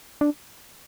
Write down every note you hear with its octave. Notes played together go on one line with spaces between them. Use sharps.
D4